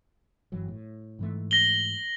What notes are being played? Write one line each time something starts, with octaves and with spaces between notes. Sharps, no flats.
G1 E3 F#3
A2
G#2 E3 A3
A#6 F#7 G7